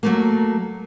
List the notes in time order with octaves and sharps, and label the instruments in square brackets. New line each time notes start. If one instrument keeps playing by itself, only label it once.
[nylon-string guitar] F#3 A3 A#3